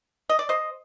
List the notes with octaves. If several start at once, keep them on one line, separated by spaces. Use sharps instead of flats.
D#5
D5
C5 D#5